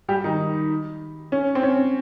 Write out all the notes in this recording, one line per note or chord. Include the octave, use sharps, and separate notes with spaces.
G3 G4
D#3 D#4
C#4
C4
C#4